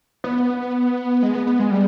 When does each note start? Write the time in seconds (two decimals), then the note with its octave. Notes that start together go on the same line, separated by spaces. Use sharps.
0.24 B3
1.23 G#3
1.35 B3
1.47 B3
1.59 G#3
1.71 G3